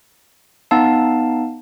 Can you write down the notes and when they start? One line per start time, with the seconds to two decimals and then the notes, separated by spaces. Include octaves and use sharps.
0.71 B3 D#4 F5 A5